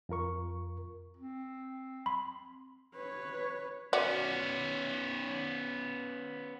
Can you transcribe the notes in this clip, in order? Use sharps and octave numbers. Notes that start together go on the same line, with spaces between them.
F2 F4 A#4 C#6
C4
B5 C6
B4 C#5
B3 C#4 F#4 D5